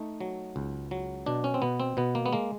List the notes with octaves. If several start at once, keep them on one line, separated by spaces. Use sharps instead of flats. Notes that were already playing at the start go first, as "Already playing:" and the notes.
Already playing: A3 D#4
F#3
C#2
F#3
B2 D4
C#4
C4
B2 B3
C4
B2 B3
A#3
B3
G#3 A#3